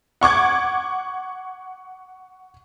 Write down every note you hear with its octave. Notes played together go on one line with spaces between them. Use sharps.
F#5 C#6 D6 G#6